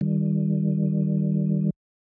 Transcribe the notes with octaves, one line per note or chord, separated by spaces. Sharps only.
D#3 G3